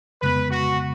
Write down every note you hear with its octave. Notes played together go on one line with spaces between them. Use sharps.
F2 C#3 G#3 B3 B4
F#4